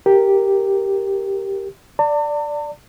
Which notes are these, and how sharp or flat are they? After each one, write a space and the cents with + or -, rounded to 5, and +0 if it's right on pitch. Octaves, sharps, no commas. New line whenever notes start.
G4 +0 A#4 -5
D5 +0 A5 +45